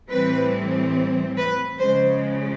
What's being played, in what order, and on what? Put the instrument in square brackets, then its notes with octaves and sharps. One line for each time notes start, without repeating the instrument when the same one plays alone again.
[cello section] A2 E3 G3 C4 B4
B4
C#3 F3 G#3 C5